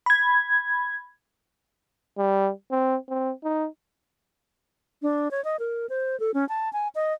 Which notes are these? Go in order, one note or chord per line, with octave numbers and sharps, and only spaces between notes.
B5 G#6
G3
C4
C4
D#4
D4
C#5
D#5
A#4
C5
A4
C#4
A5
G#5
D#5